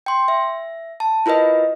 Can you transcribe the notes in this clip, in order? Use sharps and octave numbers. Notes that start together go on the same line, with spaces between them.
G5 C6
E5
A5
E4 F4 A#4 B4 D#5